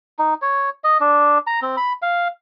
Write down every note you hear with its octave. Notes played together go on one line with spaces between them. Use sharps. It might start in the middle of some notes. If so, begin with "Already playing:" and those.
D#4
C#5
D#5
D4
A#5
C4
B5
F5